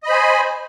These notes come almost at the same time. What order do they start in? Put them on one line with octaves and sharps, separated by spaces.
D#5 B5 C5 G#5